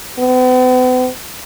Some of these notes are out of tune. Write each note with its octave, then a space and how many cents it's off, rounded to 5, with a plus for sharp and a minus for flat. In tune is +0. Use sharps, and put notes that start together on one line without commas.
B3 +45